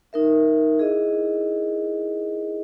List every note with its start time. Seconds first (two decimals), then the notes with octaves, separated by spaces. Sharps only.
0.13 D#4 A#4 E5
0.79 E4 G#4 D#5